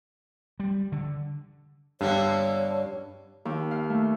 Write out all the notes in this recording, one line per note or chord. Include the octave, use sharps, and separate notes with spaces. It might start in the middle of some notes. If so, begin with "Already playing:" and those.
G3
D3
G2 D3 A#3 B3 C#5
D#2
F5
A3